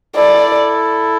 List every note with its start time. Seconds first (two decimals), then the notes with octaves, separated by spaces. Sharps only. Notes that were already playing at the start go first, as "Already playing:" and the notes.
0.16 E4 A4 D5